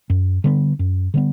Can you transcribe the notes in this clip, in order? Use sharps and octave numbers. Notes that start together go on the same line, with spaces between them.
F#2
D3 G3 B3
F#2
D3 G3 B3